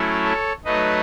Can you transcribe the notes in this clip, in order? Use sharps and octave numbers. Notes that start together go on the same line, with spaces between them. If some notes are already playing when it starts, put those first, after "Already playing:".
Already playing: F#3 A3 C#4 E4
A4 C#5
F#3 A3 D#4 B4 D#5